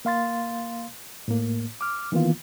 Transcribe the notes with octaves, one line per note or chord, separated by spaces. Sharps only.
A#3 F5 C6 A6
A2 A#3
D6 F6
D#3 E3 A#3 B3 F4